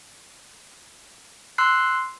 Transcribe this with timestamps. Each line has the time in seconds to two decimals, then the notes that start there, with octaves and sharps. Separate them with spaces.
1.58 C6 E6 F#6 C7